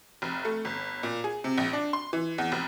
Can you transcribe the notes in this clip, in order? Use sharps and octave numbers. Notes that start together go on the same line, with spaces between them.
F1
A3
G1
A#2
G#4
C3
A#1
D4
C6
E3
E2
F1